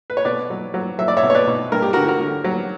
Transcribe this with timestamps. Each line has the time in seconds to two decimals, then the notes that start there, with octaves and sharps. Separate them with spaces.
0.10 B4
0.17 C#5
0.25 B2 B4 D5
0.50 F#3
0.74 F#3
0.99 F#3 E5
1.08 D5
1.17 C#5 E5
1.23 B2
1.30 C#5
1.35 B4 D5
1.47 B2
1.72 G2 A#4
1.82 G4
1.93 D3 F#4 A#4
2.08 F#4 A#4
2.21 D3
2.44 F#3